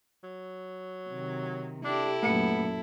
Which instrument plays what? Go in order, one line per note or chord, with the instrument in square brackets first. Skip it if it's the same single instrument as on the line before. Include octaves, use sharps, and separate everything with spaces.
[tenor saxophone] F#3
[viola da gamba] C3 D#3
[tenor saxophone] D4 [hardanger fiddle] E4 A4 [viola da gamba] G4
[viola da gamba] F#2 A#2 [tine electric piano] A3 C#7 [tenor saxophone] B3